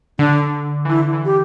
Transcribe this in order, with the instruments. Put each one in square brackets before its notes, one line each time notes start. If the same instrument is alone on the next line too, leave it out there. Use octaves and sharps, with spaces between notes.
[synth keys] D3 [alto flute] D4
[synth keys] E3
[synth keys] D3 [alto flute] E4
[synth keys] E3
[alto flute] G4